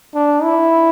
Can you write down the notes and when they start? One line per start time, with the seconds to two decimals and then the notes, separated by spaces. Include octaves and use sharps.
0.15 D4
0.43 E4